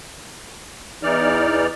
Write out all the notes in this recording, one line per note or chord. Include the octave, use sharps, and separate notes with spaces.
E2 E3 D#4 D5 F6